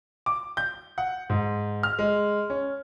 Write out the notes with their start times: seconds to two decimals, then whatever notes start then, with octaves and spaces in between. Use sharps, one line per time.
0.26 D6
0.57 G6
0.98 F#5
1.30 G#2
1.83 F6
1.99 G#3
2.50 C#4